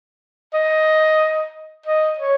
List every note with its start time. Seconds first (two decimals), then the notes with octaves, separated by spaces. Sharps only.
0.53 D#5
1.86 D#5
2.18 C#5